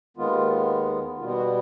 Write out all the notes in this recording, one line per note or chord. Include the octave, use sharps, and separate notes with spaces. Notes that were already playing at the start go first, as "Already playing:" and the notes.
D#2 D#3 G#3 B3 F4
B2 G3 B3 F4
F#4